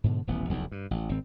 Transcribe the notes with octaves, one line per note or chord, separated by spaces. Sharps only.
G#2 B2 D3
D#1 A1 B3
F1 B1 E2
G2
A1
G#1 C4